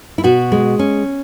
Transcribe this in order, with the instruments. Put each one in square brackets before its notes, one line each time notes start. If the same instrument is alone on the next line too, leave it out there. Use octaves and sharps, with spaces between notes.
[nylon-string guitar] E4
B2 F#4
G#3
C#4